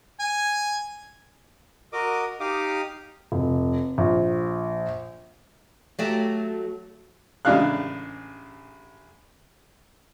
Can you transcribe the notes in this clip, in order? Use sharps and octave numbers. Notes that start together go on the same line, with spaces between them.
G#5
F#4 A#4 D#5 D6 D#6
D#4 G4 F5 D6 D#6
F1
A#1
F#3 A3 G4
A1 C#3 G#3 D4 F5 F#6